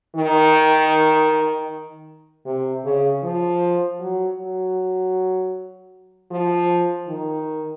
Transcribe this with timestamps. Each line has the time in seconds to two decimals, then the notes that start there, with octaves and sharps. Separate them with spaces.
0.16 D#3
2.46 C3
2.85 C#3
3.23 F3
4.00 F#3
4.39 F#3
6.31 F3
7.08 D#3